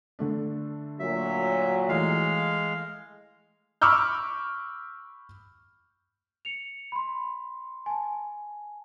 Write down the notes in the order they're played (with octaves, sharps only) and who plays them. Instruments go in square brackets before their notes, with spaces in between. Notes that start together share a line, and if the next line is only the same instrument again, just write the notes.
[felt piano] D3 A3 D4
[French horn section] A#2 F#3 [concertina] E5
[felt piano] E3 A3 C7 [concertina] G#3 F5
[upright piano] B5 C#6 D6 E6 F6 G6
[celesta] C#7 F7
B5 C6
G#5 A5